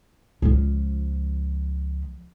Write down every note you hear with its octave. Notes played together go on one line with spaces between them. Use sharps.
C#2 F3